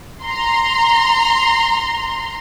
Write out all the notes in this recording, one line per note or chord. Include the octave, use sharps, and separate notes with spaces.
A#5 C6